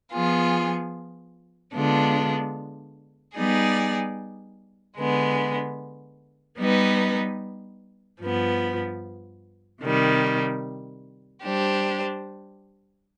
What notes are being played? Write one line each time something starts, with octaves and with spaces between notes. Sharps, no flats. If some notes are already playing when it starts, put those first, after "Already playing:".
F3 B3 F4 G#4
D3 G#3 B3 D4 F4
G3 B3 D#4 G#4 D5
D3 G#3 B3
G3 B3 D#4 B4
G2 F3 B3
C3 D#3 G3
G3 D4 G4 C5